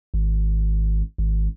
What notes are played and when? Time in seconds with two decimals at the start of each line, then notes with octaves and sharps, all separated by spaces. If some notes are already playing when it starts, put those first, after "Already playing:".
0.14 G#1
1.18 G#1